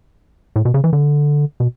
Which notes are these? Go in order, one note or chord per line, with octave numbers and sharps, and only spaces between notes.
A2
B2
C#3
E3
D3
B2